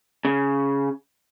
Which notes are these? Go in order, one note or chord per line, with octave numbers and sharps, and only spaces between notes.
C#3